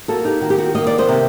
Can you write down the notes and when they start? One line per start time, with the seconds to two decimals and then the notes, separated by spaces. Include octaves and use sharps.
0.08 A#3 F#4 A4
0.25 D#4 G4
0.42 D#3 F#4
0.50 G4
0.58 F#4
0.75 A#3 D#5
0.87 D5
0.98 C5 D#5
1.08 C3